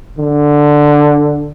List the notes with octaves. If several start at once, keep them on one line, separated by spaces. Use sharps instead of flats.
D3